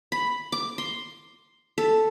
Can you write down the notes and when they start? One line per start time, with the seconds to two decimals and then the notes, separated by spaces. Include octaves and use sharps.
0.12 B5
0.52 D6
0.78 C6
1.78 A4